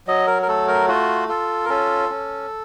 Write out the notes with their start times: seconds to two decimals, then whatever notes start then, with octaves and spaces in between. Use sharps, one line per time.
0.07 F#3 D#5
0.27 A#4
0.42 A#4
0.48 A3 A4
0.68 A#4
0.88 F4 F#4
1.28 F4 A4
1.65 A#4
1.69 C#4 A4
2.09 C#4